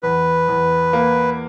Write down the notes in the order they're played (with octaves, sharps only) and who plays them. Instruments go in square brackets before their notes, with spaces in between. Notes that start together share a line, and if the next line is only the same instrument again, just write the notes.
[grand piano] E2 [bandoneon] B4
[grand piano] E2
A#3